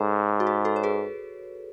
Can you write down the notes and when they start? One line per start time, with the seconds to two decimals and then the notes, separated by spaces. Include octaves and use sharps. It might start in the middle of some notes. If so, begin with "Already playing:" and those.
Already playing: G#2 A4 C#5
0.40 F#4
0.47 G#4
0.65 F#4 A4
0.76 C#5
0.83 G#4 B4